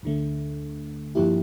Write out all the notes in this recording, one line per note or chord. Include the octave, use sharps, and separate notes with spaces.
D2 D3 A3
G2 F3 A#3 E4 G4